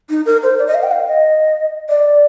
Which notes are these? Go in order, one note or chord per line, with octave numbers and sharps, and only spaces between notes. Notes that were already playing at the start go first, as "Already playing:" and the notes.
D#4
A#4
C5
D5
D#5
F5
G5
F5
D#5
D5